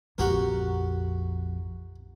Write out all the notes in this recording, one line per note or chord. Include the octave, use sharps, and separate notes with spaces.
A#1 F2 F#4 G4 A#4